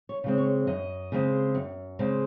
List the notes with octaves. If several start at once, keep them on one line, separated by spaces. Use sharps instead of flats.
C#5
C#3 G#3 C4
C#5
F#2 D#5
C#3 G#3 C4
F#2
C#3 G#3 C4